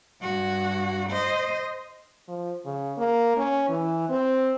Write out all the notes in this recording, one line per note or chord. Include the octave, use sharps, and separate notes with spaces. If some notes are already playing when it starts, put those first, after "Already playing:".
G2 F#4
C5 D#5
F3
C#3
A#3
C#4
E3
C4